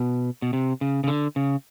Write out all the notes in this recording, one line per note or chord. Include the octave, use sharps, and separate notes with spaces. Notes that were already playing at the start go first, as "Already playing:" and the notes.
Already playing: B2
B2
C3
C#3
C#3
D3
C#3